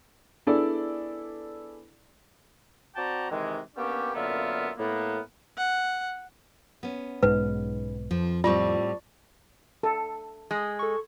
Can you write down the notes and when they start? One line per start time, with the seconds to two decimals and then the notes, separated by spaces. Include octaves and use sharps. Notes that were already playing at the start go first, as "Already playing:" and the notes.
0.46 B3 D4 E4 G#4 A4 D5
2.95 C4 F#4 D5 G5 A5 A#5
3.30 C3 D#3 E3 G#3
3.76 A#3 B3 C#4 D4 G4
4.14 F#2 D3 A#3 B3 F4 E5
4.78 A2 A#3 B3
5.57 F#5
6.83 B3 C#4
7.23 B1 G#2 G#3 B4
8.11 F2 F3
8.44 A2 G3 C4 F4 D5 A5 C#6
9.83 A4
10.51 G#3 D#6
10.79 A4 C#6